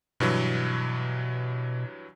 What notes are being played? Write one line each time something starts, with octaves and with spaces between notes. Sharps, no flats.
G2 B2 E3 F#3